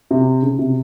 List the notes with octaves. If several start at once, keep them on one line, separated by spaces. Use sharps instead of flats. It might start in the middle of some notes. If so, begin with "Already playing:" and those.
C3
C#3
C3